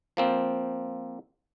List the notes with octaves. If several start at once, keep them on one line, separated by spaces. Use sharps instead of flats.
F3 A#3 C4